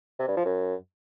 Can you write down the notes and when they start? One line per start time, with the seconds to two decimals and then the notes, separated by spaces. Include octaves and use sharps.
0.19 C3
0.28 G2
0.37 F3
0.45 F#2